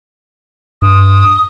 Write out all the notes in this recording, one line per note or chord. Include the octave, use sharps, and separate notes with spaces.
G2 D#6